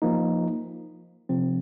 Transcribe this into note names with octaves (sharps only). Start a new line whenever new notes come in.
F3 A#3 D#4
C3 F3 C4